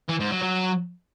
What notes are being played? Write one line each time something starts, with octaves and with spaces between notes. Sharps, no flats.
E3
G#2
F#3
F#3